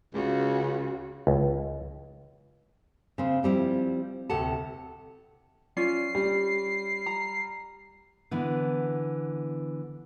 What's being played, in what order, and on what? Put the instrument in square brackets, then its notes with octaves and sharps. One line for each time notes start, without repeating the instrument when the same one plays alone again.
[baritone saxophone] C#2 [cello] C#3 F#4
[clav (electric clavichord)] C#2
[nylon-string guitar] C#3 C4
F3 G3 C4 E4
D2 A2 C3 A4 F#5 A5
[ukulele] C#4 F4 D5 [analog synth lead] C7
[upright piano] G3
[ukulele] A#5
[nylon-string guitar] D3 E3 B3